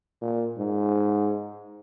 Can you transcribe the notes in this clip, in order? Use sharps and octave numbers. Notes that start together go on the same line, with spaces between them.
A#2
G#2